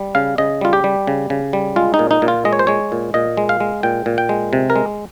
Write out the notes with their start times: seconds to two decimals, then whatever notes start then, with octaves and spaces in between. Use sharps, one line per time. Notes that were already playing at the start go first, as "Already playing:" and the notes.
Already playing: G3
0.15 C#3 F5
0.38 C#3 D#5
0.61 G3 F4
0.73 G4
0.84 G3
1.07 C#3
1.30 C#3
1.53 G3
1.76 G#3 F4
1.94 D#4
1.99 A#2
2.11 D#4
2.22 A#2
2.28 F4
2.45 G#3 D#5
2.53 C#5
2.59 C5
2.67 G#3 C#5
2.92 A#2
3.14 A#2 D#5
3.37 G#3
3.49 F5
3.60 G#3
3.83 A#2 G5
4.06 A#2
4.18 G5
4.29 G#3
4.53 C3
4.70 A#4
4.76 G#3